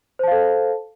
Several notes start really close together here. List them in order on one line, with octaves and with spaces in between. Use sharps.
C5 A5 F5 A4